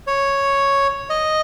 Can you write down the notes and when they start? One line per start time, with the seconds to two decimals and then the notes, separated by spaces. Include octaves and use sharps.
0.07 C#5
1.10 D#5